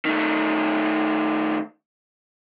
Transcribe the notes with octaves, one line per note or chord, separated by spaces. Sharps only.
D#3 A3